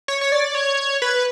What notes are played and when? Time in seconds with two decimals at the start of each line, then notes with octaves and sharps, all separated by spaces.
0.08 C#5
0.21 C#5
0.32 D5
0.55 C#5
1.02 B4